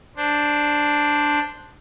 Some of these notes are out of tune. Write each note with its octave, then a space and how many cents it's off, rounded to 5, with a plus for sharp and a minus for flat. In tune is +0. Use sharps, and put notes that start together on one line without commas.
D4 +0 C5 +0